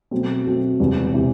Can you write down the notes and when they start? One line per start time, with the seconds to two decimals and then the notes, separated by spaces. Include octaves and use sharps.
0.11 B2 F#3 A3 C4
0.45 B2 F#3 A3 C4
0.80 E1 E2 C3 E3
1.14 C3 E3